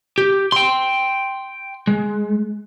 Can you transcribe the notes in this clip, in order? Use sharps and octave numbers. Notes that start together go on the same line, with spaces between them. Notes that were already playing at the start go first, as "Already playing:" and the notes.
G4
G5 C6
G#3